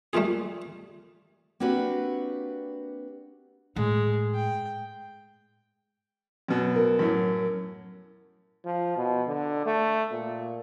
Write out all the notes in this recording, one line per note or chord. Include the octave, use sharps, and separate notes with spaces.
G3 A3 A#3 F4 G#4
A#3 C4 D4 F#4 G4 B4
A2 G#3
G5
F#2 B2
A#4
F#2 A2
F3
B2
D3
A3
A#2